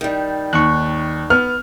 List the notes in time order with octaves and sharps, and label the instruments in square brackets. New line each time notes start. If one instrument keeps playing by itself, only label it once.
[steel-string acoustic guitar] D#3 G3
[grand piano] D#2 [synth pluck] C#6 F#6
[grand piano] B3 [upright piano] F6